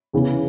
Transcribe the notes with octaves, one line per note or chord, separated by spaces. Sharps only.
E2 C#3 E3